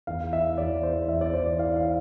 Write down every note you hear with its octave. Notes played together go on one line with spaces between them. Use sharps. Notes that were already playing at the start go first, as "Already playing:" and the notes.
E2 F5
E3 E5
E2 D5
E3 C5
E2 E5
D5
E3 C5
D5
E3 F5
F5